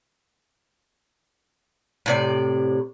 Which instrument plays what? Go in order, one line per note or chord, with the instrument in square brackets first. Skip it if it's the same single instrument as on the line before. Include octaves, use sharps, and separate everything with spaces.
[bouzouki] A2 C3 D5